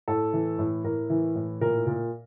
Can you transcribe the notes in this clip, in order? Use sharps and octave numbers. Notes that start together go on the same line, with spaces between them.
A2 A4
E3
A2
A2 A#4
E3
A2
A#2 A#4
A#2